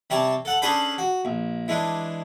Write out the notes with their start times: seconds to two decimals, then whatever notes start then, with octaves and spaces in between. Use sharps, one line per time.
0.10 C3 G3 C#5 D5 A5
0.45 A4 F#5 A5
0.62 C#4 D4 G#4 A4 C5 B5
0.98 F#4
1.25 A#1
1.68 E3 G#3 D4